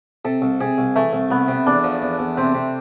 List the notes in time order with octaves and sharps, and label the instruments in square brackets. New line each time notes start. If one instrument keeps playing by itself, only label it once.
[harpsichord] C3 [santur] A4
[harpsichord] C2
[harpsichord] C3 [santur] G#4
[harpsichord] C2
[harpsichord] E3 [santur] A3
[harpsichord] C2
[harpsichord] C2 [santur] B3
[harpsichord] C3
[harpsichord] E2 [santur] D4
[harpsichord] F3
E2
E2
[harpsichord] C3 [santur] C4
[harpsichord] C3